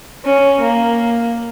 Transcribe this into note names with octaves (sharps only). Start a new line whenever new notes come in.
C#4
A#3